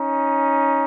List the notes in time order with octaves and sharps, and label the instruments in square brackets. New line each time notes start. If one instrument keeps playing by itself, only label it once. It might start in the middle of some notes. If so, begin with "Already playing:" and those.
Already playing: [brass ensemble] C#4 D#4